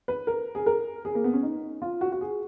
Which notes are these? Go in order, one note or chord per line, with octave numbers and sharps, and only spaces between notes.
B4
A#4
G#4
A#4
G#4
A#3
B3
C#4
D#4
F4
F#4
F#4
G#4